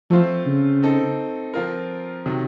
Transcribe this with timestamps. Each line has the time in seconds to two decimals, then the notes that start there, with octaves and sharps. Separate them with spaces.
0.11 F3 A3 C4 F4 C5
0.46 C#3
0.83 C4 D#4 A4
1.54 F3 C4 F4 A#4
2.26 C3 D#3 F#3